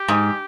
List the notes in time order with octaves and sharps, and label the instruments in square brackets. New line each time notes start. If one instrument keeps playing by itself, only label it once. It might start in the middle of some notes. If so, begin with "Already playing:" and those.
Already playing: [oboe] G4
[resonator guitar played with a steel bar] G#2